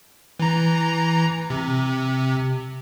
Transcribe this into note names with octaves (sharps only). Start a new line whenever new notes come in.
E3 A#5
C3